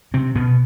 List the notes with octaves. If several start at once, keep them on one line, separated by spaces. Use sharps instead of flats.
C3 C4
B2 B3